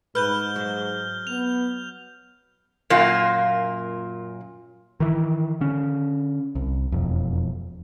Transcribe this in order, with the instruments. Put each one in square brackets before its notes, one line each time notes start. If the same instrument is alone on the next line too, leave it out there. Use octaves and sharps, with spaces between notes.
[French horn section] G#2 [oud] B4 [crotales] F6 G6 G7
[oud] F#3
[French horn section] B3 [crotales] F7
[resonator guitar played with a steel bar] F#2 A#2 A#3 F4
[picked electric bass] D#3 E3
D3 C#4
C2
E1 F2